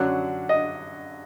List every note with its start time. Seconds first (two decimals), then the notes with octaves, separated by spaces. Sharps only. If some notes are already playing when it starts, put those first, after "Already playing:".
Already playing: F#2 D3 F#3 D4 F#5
0.49 D#5